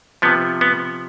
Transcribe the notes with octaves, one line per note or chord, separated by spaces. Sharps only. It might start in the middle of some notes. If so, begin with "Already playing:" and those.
C3 F3 B3
B3